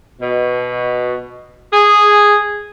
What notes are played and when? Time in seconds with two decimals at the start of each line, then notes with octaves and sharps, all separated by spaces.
0.21 B2
1.72 G#4